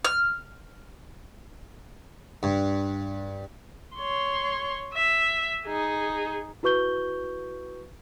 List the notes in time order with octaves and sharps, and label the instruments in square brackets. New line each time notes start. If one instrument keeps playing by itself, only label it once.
[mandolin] F6
[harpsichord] G2
[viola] C#5 C6
E5
D#4 G#4
[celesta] E4 F#4 B4 C#6 G6 G7